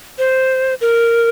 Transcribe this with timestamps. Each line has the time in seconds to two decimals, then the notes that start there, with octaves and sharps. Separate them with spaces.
0.18 C5
0.81 A#4